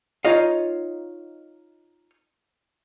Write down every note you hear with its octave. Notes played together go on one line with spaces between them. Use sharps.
D#4 F4 C#5 D#5 F5